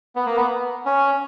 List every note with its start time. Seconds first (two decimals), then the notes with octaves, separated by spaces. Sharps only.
0.16 B3
0.26 A#3
0.36 B3
0.86 C#4